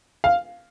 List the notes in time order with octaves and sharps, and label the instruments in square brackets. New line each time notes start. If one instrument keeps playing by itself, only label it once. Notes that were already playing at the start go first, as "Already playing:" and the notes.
[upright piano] F5